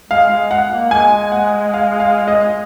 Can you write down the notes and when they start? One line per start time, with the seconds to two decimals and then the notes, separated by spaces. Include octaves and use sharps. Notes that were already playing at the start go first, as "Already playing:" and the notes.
0.10 G#3 F5
0.30 G#3
0.51 F#5
0.71 A#3
0.91 G#3 G#5
1.32 F#5
1.74 F5
2.00 F5
2.28 D#5